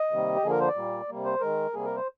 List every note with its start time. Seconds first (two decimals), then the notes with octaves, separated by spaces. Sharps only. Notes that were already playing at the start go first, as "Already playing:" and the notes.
Already playing: D#5
0.11 C3 D#3 G3 A#3
0.36 G4
0.43 D3 F3 A#3 G#4
0.51 A#4
0.60 C5
0.68 D5
0.75 A#2 G3 A#3
1.09 C3 G3 A#3
1.25 C5
1.41 D#3 G#3 A#4
1.74 C3 G3 A#3 G#4
1.85 A#4
1.96 C5